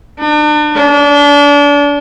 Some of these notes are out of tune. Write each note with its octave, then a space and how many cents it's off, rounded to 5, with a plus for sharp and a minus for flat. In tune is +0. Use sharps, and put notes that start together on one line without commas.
D4 +35
D4 -30